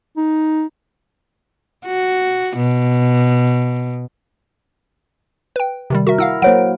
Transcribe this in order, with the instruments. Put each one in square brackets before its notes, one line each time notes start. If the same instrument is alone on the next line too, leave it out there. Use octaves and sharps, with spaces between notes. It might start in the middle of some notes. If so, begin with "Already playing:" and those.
[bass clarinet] D#4
[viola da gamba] F#4
B2
[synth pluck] B4 G5
C3 D#3 G3
[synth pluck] F#4 E5 [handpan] A#4
[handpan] E4 [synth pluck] F5 F#5 E6
[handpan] F#3 A#3 [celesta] C5 C#5 F#5 [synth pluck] D7